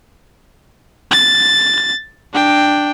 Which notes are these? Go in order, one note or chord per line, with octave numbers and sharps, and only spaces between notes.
A6
D4 G5